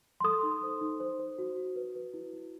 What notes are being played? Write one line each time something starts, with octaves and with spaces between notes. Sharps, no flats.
C6
A4 D#6
D#4
C5
D#4
C5
C5
F#4
F#4
B4
B4
E4
E4